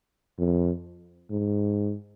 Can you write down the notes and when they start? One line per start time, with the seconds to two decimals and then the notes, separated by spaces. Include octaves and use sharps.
0.38 F2
1.31 G#2